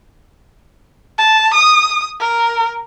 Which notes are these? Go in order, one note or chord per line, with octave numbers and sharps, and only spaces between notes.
A5
D#6
A#4